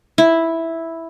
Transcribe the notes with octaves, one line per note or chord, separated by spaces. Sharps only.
E4